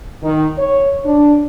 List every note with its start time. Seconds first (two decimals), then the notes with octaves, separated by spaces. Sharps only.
0.23 D#3
0.58 C#5
1.05 D4